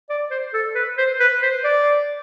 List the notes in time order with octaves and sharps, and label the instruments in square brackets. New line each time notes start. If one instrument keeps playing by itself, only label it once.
[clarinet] D5
C5
A4
B4
C5
B4
C5
D5